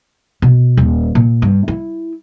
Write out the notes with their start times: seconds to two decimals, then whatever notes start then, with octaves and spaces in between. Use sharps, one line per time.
0.42 B2
0.77 D#1
1.15 A#2
1.42 G2
1.68 E4